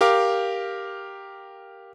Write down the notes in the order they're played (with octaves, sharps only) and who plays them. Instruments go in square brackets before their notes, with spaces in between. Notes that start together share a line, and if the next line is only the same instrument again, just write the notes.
[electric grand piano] G4 A#4 F5 D6